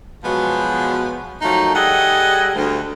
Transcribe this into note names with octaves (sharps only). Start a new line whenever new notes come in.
B2 F3 F#3 G#3 B3
D#3 F3 F#3 A3 D#4
G3 G#4 A4 D#5 F#5
D2